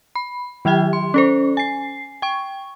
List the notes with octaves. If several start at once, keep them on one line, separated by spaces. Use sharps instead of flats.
B5
D#3 F#3 G4 E5 G5
C6
C#4 A4 C5
G#5 C7
G5 C#6